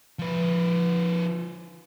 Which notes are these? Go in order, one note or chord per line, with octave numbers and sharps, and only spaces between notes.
F3 B4